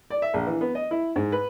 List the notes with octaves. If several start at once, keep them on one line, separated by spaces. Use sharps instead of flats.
D5
E5
A#1
E3
B3
D#5
E4
G#2
B4